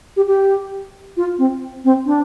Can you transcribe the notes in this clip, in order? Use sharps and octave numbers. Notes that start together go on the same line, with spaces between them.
G4
G4
F4
C4
C4
D4